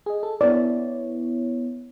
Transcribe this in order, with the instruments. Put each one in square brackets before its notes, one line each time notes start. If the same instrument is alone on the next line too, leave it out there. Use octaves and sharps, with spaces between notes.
[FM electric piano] G#4 D#5
A4
[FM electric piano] B3 E4 C#5 [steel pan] D5